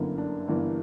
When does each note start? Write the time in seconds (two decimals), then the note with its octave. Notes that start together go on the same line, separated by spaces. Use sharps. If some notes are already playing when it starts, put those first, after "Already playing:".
Already playing: G1 F#2 D3 A#3 E4
0.18 D4
0.48 G1 G2 E3 A#3